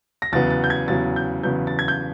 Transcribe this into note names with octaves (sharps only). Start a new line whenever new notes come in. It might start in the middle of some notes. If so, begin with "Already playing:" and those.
A#6
E2 C#3 F#3 B3 A6
A6
G6
G#6
E2 C#3 F#3 B3 A6
G6
E2 C#3 F#3 B3 G6
A6
G#6
G6